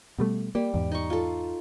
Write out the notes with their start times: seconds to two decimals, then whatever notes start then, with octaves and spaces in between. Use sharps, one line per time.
0.19 B2 G3 A3
0.55 G3 A#3
0.74 E2 G#2
0.92 D#4 C#6
1.10 F4 A4